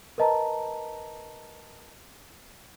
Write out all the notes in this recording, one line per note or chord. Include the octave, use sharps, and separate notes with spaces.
A#4 B4 D#5 A5 A#5